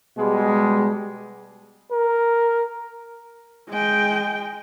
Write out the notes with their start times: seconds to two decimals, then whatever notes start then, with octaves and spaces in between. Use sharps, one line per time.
0.18 B2 G3 G#3
1.91 A#4
3.69 G#3 G5